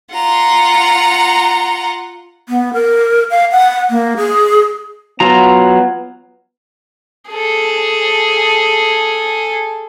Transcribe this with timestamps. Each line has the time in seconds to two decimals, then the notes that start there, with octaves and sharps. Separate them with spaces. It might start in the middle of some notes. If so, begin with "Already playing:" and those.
0.13 F4 F#5 A#5
2.49 B3
2.73 A#4
3.31 F5
3.52 F#5
3.90 A#3
4.17 G#4
5.20 F#3 B3 F4 A#5
7.30 G#4 A4